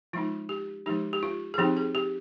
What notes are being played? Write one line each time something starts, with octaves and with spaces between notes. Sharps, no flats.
F3 G#3 D#4 F4
G4
F3 G#3 D#4 G4
G4
F4
G#4
F3 C4 D#4 G4
G#4
G4